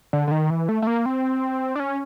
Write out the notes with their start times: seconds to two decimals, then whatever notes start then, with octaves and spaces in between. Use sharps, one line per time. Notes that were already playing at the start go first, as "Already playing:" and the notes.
0.13 D3
0.28 D3
0.31 D#3
0.50 E3
0.69 A3
0.82 A3
0.87 A#3
1.06 C4
1.76 D4
1.80 C#4